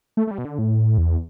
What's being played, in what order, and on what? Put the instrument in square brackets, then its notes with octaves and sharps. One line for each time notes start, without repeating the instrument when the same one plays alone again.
[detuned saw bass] A3
A3
G3
B2
D3
A2
E2